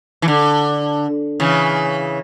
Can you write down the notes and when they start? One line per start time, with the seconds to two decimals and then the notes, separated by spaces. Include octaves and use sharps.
0.22 E3
0.28 D3
1.40 C#3 E3